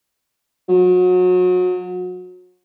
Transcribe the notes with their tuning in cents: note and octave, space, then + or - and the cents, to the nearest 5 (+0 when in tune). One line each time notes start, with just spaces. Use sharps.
F#3 -30